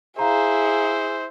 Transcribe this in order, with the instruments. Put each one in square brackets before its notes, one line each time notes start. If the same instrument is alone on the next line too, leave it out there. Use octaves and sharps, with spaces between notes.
[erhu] E4 [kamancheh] G#4 [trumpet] C5 [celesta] F5 A#5